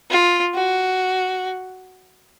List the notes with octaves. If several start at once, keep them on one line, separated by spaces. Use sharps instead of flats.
F4
F#4